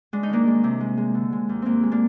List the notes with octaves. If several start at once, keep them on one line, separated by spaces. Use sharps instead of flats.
G#3 D4
D#4
D#3 A#3 D4
G#3
C3
G#3
G#3
D3
G#3
D#2
D#2 A#3 C4
G#3
A#3 D4